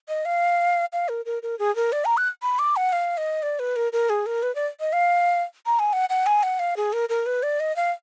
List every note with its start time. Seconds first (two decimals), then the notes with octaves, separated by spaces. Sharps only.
0.09 D#5
0.25 F5
0.93 F5
1.09 A#4
1.26 A#4
1.43 A#4
1.59 G#4
1.76 A#4
1.92 D5
2.05 A#5
2.17 F#6
2.42 B5
2.59 D6
2.76 F#5
2.93 F5
3.17 D#5
3.43 D5
3.59 B4
3.76 A#4
3.93 A#4
4.10 G#4
4.26 A#4
4.43 B4
4.55 D5
4.80 D#5
4.93 F5
5.66 A#5
5.79 G#5
5.93 F#5
6.10 F#5
6.26 G#5
6.43 F#5
6.59 F5
6.77 G#4
6.93 A#4
7.09 A#4
7.26 B4
7.43 D5
7.60 D#5
7.76 F5